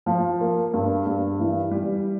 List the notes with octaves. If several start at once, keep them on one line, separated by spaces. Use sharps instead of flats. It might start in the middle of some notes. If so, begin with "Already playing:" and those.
F3
A#3
G2
G2
E3
G3